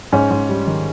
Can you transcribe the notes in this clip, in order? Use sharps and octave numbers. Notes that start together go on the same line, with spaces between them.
G#2 C#4
G#2
G3
D#3